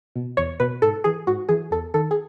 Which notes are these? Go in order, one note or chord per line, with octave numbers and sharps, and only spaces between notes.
B2
E2 C#5
B2 B4
G#2 A4
E3 G#4
G#2 F#4
E3 G#4
E2 A4
D#3 A4
G#4